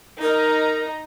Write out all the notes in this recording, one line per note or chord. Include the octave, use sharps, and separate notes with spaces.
D#4 A#4 A#5